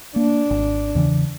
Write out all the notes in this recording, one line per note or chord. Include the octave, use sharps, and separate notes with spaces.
A#3 D4
G#1
E2 C#3 E3